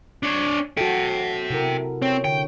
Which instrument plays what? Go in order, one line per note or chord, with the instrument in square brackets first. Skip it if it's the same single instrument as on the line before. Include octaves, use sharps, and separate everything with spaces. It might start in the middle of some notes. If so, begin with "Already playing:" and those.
[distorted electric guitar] D4 C#5
[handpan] F#4 A4 [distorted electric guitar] E5 G5
[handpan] C3 E4 A#4
[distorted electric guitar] C4 [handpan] C#5
[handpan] D3 [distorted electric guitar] G5